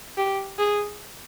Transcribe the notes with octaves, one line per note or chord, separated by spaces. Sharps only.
G4
G#4